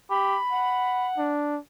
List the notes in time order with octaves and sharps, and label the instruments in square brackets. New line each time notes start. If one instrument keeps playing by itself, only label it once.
[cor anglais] G4 [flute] B5
[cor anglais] F#5
[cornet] D4